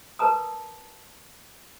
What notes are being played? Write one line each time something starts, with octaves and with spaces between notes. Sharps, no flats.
A#4 B4 A5 A#5 D#6